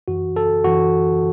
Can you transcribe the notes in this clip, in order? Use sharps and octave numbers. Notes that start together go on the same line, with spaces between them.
F#2 E3 F#4
A4
F#2 E3 F#4